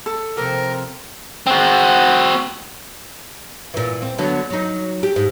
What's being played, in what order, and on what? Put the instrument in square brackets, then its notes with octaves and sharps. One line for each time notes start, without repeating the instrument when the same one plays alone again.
[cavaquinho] A4
[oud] C3 F3 G4 [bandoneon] A#4
[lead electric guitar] C4 F#4
[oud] A#2 E3
C4
D3 F#3 B3
F#3 D#4
G4
G#2